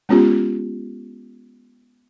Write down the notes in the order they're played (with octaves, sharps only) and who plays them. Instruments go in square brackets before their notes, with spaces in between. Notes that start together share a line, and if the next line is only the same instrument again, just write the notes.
[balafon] G#3 B3 C#4 F4 G4